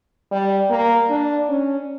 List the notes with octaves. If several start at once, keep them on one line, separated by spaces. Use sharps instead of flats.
G3
A#3
D4
C#4